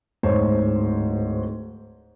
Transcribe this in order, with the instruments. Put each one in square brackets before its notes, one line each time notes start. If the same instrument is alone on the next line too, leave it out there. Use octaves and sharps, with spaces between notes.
[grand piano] D1 G#2 C5 C#5